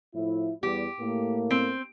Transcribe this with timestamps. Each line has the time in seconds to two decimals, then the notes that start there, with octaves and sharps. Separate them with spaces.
0.14 A2 F3 E4
0.63 E2 G3 G4
1.00 A2 A3 A#3
1.51 C4